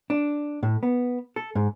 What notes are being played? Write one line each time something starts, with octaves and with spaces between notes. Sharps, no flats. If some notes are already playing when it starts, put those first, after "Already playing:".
D4
A2
B3
A4
G#2